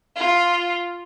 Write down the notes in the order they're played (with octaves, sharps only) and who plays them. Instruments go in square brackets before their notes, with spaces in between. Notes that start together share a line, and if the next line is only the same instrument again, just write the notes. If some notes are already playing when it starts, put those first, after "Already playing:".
[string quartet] F4